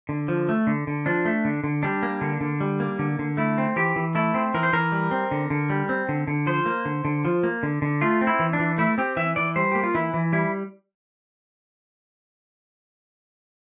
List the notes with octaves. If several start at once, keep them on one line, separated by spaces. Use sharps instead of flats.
D3
F3
A3
D3
D3
F3 D4
A3
D3
D3
G3 D4
A#3
D3
D3
G3
A#3
D3
D3
A3 E4
C4
E3 G4
E3
A3 E4
C4
E3 A#4
C5
E3 A#4
G3
C4
D3
D3
G3
C4
D3
D3
F3 C5
A#3
D3
D3
F3
A#3
D3
D3
A3 F4
C4
E4
E3
D4
E3
A3 E4
C4 G4
E3 E5
E3 D5
G3 C5
A#3 G4
F4
E3 E4
E3
G3 E4